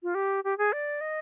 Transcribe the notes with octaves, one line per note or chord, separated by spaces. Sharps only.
F4
G4
G4
G#4
D5
D#5